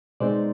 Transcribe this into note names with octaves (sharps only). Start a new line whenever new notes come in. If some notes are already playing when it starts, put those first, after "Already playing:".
B2 G#3 C4 D#4 C5 D5